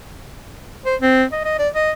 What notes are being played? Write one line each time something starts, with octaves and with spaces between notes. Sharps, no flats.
C5
C4
D#5
D#5
D5
D#5